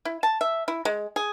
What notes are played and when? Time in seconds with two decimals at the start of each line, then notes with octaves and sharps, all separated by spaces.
0.05 E4
0.23 A5
0.41 E5
0.68 E4
0.85 G#3
1.16 G#4